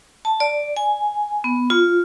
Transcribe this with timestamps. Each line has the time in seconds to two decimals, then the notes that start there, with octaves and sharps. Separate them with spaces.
0.25 A5
0.40 D5
0.77 G#5
1.44 B3
1.70 F4